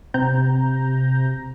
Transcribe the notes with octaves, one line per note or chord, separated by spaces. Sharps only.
C3 A#5 G6